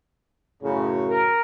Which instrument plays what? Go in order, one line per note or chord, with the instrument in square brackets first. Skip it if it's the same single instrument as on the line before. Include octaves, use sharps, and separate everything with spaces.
[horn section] F#2 A2 C#3
[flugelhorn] A#4